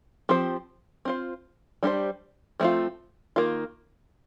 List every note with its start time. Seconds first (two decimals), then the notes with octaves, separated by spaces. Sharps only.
0.29 F3 C4 G4 C5
1.05 C4 F4 C5
1.83 G3 D4 G4 C5
2.60 F3 A3 C4 F4
3.36 D#3 A#3 F4